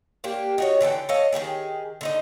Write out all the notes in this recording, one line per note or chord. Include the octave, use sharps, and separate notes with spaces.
A#3 D4 G4
D#4 F#4 C#5
D3 E3 A4 G5
A4 C#5 D#5 F5
D#3 G3 G4 G#4
D3 D#4 D#5